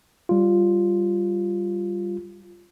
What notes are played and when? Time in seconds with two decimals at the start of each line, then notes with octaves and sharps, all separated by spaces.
0.29 G3 F4